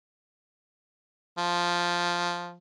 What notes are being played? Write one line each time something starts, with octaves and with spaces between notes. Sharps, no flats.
F3